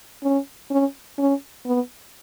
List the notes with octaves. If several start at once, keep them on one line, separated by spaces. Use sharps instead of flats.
C#4
C#4
C#4
B3